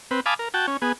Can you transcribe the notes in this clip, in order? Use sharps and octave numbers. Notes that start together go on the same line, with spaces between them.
C4 B4
F5 G#5 A5 B5 D6 D#6
A#4
F#4 G5 A5
C#4
B3 G#4